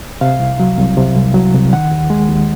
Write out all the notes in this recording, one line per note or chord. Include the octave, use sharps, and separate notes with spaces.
C3 F5
C2
F#3
C2
C3
C2
F#3
C2
D#3 F#5
D#2
G#3
D#2